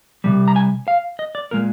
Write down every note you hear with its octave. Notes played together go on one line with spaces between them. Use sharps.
C3 D#3 G3
A#5
G#5
F5
D#5
D5
A#2 G#3 A#4